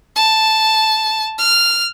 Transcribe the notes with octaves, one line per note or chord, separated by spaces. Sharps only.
A5
F6